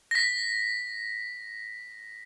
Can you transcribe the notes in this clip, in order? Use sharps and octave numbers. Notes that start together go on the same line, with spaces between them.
A#6 B6